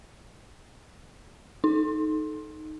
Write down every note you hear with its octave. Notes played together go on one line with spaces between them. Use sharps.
D#4